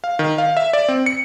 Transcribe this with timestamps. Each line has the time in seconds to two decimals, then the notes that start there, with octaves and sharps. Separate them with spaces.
0.04 F5
0.19 D#3
0.38 F5
0.57 E5
0.73 D5
0.88 C4
1.06 C#7